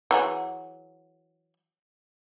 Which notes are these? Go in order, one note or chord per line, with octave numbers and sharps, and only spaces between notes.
E3 F#3 G#4